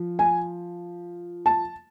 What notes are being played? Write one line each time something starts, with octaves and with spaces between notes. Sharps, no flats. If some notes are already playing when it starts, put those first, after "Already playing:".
Already playing: F3
G#5
A5